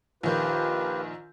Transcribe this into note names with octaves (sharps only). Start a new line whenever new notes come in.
A#1 D#3 F4 G4 B4 G6